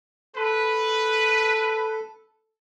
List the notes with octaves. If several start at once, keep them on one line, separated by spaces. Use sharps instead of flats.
A4 B4